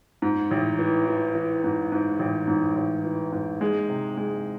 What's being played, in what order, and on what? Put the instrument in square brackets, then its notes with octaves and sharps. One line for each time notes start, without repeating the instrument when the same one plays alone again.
[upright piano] G#2
A1
E3
E3
E3
G#2
G#2
A1
G#2
A1
E3
G#2
G#3
C3
G#3